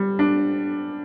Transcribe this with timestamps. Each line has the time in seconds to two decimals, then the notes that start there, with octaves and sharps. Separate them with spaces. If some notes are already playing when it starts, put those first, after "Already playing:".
Already playing: G3
0.19 D4